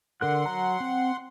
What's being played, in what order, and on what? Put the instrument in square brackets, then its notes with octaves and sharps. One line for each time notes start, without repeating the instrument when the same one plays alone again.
[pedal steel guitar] D3 A#4 F#6 [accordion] F#5 C6
[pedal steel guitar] F#3 A#5
C4